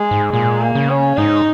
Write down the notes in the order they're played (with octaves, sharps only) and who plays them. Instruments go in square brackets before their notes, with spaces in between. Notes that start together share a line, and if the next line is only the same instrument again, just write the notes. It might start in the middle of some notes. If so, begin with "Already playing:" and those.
Already playing: [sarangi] G#3
[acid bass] G#2
[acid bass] A#2 [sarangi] G#3
[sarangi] A#3
[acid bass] C#3
[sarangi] C#4
[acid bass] G#2 [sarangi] D#4